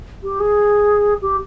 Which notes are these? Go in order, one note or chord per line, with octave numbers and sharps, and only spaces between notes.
G4
G#4
G4